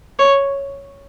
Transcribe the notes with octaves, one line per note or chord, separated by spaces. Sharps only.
C#5